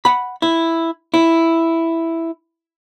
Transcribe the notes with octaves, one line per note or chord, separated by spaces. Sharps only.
F#5 B5
E4
E4